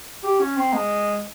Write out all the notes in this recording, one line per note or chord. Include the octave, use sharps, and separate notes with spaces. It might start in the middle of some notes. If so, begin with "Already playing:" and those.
G4
C#4
C4
G#3